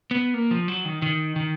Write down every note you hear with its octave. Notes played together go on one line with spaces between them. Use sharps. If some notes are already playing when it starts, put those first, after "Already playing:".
B3
A#3
F3
F#3
D#3
D#3
D#3